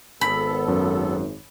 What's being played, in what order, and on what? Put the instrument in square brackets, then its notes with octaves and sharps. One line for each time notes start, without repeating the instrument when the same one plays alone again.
[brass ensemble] G#1 [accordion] B3 A4 [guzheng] B5
[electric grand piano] F#2